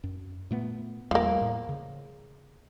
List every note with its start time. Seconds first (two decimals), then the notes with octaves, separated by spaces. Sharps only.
0.04 F#2
0.51 A#2 A3 B3
1.11 E2 F3 G3 A3 A#3
1.41 A2
1.69 C#3